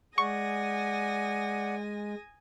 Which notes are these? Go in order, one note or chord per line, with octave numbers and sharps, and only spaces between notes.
G#3 D5 F#5 G#5 C#6 D#6 A#6